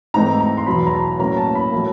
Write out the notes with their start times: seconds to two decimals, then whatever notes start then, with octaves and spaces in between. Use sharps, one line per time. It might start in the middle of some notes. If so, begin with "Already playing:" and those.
0.14 G#2 E3 A3 C4 D#4 A#5
0.40 A#5
0.57 C6
0.66 E2 B2 F#3 B5
0.87 A#5
0.93 A5
1.19 A2 F#3 A#3 C#4 A#5
1.37 A5
1.55 B5
1.72 A2 F#3 A#3